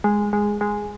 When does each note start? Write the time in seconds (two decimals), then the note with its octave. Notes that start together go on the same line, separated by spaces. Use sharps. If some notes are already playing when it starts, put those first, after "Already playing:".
0.04 G#3
0.33 G#3
0.61 G#3